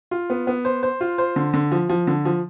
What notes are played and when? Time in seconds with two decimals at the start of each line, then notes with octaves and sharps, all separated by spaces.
0.11 F4
0.30 B3
0.47 B3
0.65 C5
0.83 C5
1.01 F4
1.18 C5
1.36 D3
1.54 D3
1.72 F3
1.89 F3
2.07 D3
2.25 F3